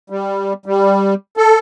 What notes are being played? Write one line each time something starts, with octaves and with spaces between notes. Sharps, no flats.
G3
G3
A4